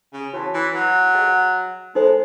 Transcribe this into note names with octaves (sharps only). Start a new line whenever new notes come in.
C#3
E3 F#4 C#5 F#5 A5
E3
F#3
G#4 D#5 F#5
G#3 D#4 A4 C5